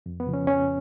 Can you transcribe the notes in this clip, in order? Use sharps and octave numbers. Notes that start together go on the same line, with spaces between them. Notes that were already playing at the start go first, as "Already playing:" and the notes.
F2
B3
C#3 F3
C#4
F2 C#4